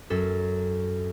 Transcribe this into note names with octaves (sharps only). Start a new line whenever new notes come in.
F#2 C#4 A4